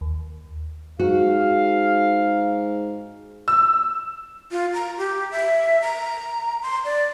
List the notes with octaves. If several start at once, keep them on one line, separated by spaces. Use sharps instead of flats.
D#2
G#2 F#4 F5
E6
F4
A#5
G4
E5
A#5
C6
D5